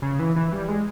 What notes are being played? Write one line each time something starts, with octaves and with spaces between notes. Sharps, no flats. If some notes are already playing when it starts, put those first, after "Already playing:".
C#3
E3
E3
G3
G#3